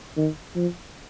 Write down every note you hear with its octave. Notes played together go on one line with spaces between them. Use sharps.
D#3
F3